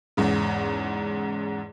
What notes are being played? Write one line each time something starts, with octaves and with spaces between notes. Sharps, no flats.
E2 G#2 C#3